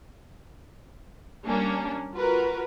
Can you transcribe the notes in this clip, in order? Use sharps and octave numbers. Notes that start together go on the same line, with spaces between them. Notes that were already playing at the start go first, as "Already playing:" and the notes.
G3 A#3 C#4 D4
F4 F#4 A#4 B4